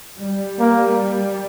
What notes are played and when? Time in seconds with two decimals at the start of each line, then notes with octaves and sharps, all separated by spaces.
0.20 G3
0.59 A#3